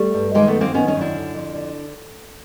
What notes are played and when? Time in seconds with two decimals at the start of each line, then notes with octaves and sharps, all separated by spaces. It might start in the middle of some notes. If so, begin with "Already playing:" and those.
Already playing: G3 A3
0.14 G2
0.34 D#3 G#3 A#3
0.48 A3 B3
0.55 F#2
0.61 A#3 C4
0.74 D#3 B3 C#4
0.88 C#4 D#4
0.95 F#2
1.01 D4 E4
1.15 D3
1.35 F2
1.55 D3